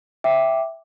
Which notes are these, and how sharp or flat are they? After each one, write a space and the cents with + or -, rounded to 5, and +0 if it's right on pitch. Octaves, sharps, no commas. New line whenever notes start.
E5 +0 G5 +0 D6 +0